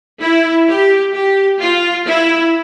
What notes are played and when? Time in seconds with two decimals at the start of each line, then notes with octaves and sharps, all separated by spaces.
0.20 E4
0.67 G4
1.13 G4
1.59 F4
2.06 E4